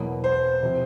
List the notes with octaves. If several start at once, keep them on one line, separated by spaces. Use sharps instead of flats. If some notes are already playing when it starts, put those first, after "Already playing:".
Already playing: E2 B2 F#3 A#3
C5
C3 F3